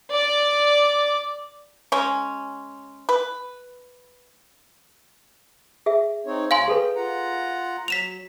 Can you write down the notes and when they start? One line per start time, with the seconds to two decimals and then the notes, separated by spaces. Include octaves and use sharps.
0.12 D5
1.92 G#3 C#4
3.09 B4
5.86 G#4 E5
6.26 C4 D#4 C#5
6.51 D2 C#5 F5 G#5 A#5 C6
6.68 G#4 A4 B4 G5
6.96 F4 F#5 A#5
7.88 F#3 B6 E7 F7